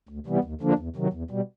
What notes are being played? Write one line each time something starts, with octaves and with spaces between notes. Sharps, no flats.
D2
C3 E3 G3 B3
D#2
D3 F3 A#3 D4
E2
C3 D#3 F#3
E2
B2 G3